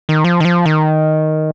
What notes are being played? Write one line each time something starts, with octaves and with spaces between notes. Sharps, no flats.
D#3
F3
D#3
F3
D#3